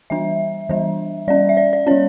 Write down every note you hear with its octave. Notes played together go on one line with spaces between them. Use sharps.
E3 G3 D4 E5
E3 G3 D4
G3 C#4 D5
E5
D5
D5
G3 C#4 C#5